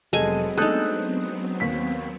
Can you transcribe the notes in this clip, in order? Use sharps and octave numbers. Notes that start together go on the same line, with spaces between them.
F1 F#3 G#3 B3 C4 A4 G#5 D#7
G#3 A3 D4 D#4 A4 D#6 F#6 G6
D#2 B6